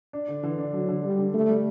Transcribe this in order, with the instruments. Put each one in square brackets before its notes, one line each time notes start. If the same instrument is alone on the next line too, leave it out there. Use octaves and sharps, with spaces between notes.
[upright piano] D4
D3
[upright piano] D3 [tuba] E3
[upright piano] D4
[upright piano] D3 [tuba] F#3
[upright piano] D3
[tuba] G3 [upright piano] D4
[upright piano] D3
[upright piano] G3 [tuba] A3
[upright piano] G3